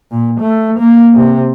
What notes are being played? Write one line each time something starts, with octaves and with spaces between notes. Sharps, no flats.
A#2
A3
A#3
C3